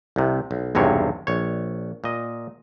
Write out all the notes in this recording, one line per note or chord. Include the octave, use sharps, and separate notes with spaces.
C2 C3
B1
B1 E2 G2 C3 C#5
A#1 C#5
A#2 D#5